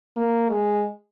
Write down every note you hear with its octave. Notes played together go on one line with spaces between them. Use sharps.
A#3
G#3